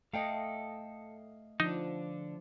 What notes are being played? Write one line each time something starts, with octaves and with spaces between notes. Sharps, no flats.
A3 A4 D#5 F5 G5
D3 F3 D4 D#4